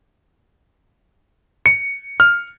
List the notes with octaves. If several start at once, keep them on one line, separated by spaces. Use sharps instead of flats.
C#7
F6